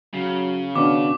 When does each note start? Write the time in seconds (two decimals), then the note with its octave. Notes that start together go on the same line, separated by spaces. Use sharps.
0.14 C#3 F#3
0.76 B2 D#3 C#4 D4 D6